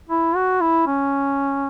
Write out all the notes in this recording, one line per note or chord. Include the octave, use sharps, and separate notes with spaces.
E4
F#4
E4
C#4